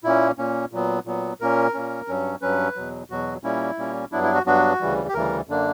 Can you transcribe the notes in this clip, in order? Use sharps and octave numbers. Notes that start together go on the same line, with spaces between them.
A#2 A#3 C#4 E4
A#2 A#3 C#4
A#2 F#3 B3
A#2 F#3 B3
A#2 A#3 C#4 A#4
A#2 A#3 C#4
G2 F#3 C#4
G2 F#3 C#4 B4
E2 B2 F#3
E2 B2 F#3 F#4
A#2 G3 A#3 C#4 E4
A#2 G3 A#3 C#4
G2 F#3 B3 D4 E4
E4
F#4
G2 F#3 B3 D4 F#4
D2 C#3 E3 G3
G4
D2 C#3 E3 G3 A#4
F#2 D3 A#3 D4